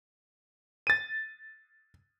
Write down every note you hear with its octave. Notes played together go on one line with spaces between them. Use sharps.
A6 D#7